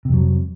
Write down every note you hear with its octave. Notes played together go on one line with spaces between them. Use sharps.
F2 C3 F#3